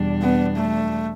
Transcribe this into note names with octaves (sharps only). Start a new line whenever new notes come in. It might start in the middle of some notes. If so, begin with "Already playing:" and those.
Already playing: E2 B2 G3 D4
B3
A3